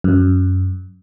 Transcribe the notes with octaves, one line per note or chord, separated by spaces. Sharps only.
F#2